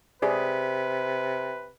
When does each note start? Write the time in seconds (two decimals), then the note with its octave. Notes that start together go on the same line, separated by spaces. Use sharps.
0.22 C3 G4 G#4 B4 D5